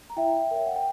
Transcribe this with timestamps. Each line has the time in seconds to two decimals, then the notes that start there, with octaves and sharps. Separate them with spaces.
0.10 A#5
0.16 E4 E5 G5
0.51 A#4 C#5 E5
0.66 F#5
0.76 G5